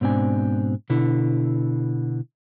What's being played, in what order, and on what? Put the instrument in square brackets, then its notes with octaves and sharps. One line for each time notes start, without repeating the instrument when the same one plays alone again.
[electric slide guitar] G#2 B2 C4 D4 G#5
B2 D3 E4